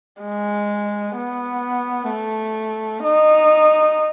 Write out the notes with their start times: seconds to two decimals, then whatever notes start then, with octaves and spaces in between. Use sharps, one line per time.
0.22 G#3
1.16 B3
2.10 A3
3.04 D#4